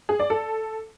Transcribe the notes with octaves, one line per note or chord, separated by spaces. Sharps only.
G#4
D5
A4